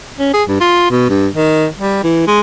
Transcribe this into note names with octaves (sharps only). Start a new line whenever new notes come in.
C#4
G#4
G2
F4
B2
G2
D#3
G3
E3
G#3